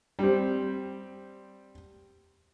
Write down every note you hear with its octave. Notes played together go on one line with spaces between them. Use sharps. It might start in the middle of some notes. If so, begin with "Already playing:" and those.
G3 C4